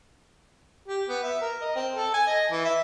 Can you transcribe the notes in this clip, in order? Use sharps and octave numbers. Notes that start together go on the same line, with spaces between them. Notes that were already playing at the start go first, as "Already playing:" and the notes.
G4
B3
E5
A#4
D#5
C4
A4
G#5
D#5
E3
E5